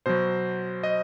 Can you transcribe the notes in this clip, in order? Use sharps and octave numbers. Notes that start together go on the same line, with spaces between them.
B2 F#3 C5
D#5